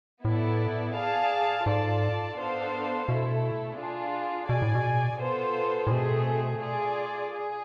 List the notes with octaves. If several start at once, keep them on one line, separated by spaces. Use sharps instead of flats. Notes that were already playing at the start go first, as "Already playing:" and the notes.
A2 B3 E4 A4 D5
G#4 D5 F5 A5
G#2 F4 A4 D5 A5
B3 D4 A4 C5 F5
B2 A3 E4 A4
D4 F4 G#4
B2 G#4 D5 G#5
A2
B2
B3 F4 A4 C5
A2
B2 A3 C4 G#4
F4 G#4 D5
G#4